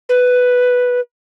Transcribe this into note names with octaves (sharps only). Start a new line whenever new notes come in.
B4